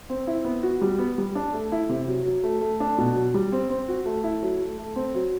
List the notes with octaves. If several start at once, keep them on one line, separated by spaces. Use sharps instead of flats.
C4
E4
B3
F#4
G3
B3
G3
D4
A3
E4
C3
F#3
F#3
A3
A3
D4
B2
F#3
G3
C4
C4
F#4
A3
E4
F#3
A3
A3
C4
F#3